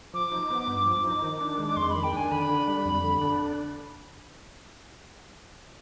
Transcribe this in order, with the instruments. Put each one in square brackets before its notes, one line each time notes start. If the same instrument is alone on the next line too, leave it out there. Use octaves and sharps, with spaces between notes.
[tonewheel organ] F3 [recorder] D6
[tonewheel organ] D#4
B3
G2
F3
D#4
D#3
D4
G#3
[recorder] D6
[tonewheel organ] F2 [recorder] C6
[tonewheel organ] D#3 [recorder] B5
[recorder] G5
[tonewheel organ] D4 [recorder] G#5
[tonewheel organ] D3 [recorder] B5
[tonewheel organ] D4
G3
F2
D3
D4